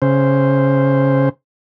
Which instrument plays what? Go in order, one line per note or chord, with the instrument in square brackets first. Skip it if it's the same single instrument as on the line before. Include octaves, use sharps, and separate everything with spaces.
[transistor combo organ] C#3 C5